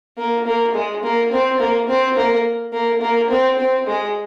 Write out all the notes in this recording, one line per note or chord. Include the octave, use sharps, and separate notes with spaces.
A#3
A#3
G#3
A#3
C4
A#3
C4
A#3
A#3
A#3
C4
C4
G#3